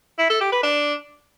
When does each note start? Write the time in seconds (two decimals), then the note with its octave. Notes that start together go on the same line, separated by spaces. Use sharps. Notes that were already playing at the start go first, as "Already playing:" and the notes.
0.19 E4
0.30 A4
0.41 G4
0.52 B4
0.63 D4